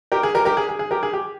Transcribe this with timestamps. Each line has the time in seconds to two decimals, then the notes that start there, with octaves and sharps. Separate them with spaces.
0.12 G4 A#4
0.23 G#4
0.35 G4 A#4
0.45 G4 A#4
0.57 G#4
0.69 G#4
0.79 G#4
0.91 G4 A#4
1.03 G#4
1.13 G4